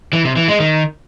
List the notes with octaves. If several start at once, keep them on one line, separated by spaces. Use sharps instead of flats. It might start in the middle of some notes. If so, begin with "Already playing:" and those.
E3
C3
E3
G#3
D#3